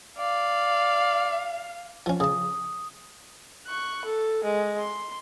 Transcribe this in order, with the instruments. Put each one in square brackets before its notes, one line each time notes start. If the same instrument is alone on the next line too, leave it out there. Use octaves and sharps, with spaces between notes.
[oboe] D5 [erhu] F5
[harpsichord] F3 C#4
[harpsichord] C#3 A5 [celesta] D#6
[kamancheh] C#6 F#6
A4
G#3
C6